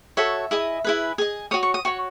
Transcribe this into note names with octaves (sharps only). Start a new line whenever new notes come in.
F#4 A4 C#5 E5
E4 G#4 D#5
E4 G#4 B4
G#4 D#5
F#4 C#5 D#6
C#6
D#6
F#4 C#5 C#6